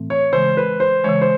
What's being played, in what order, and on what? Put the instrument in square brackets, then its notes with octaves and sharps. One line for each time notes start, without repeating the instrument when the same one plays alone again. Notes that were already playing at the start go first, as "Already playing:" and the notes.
Already playing: [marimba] A2 E3 A3 C4
[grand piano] C#5
[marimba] C#3 E3 G#3 [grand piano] C5
[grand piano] B4
C5
[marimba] C#3 E3 G#3 [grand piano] C#5
[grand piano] C5